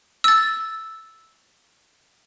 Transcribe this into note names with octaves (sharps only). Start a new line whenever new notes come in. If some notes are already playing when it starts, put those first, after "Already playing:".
E6 A6